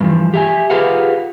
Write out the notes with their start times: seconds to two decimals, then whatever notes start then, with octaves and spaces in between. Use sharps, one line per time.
0.01 G2 E3 F3
0.34 G4 E5 G#5
0.70 F4 G4 G#4 B4 F5 F#5